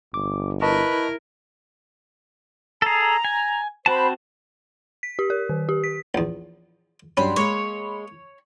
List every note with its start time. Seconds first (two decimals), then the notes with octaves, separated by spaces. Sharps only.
0.14 G1 D6
0.62 E4 A#4 B4 D#5 A5 C#6
2.82 G#4 A4 A#5
3.25 G#5
3.86 C4 F#4 C5 A5 B5
5.03 B6
5.19 G4
5.30 A#4
5.49 D#3
5.69 G4
5.84 B6
6.15 A#1 E2
7.17 G2 F#3 G3 C#4 B5 C6
7.36 G#3 A#3 G#4 C#5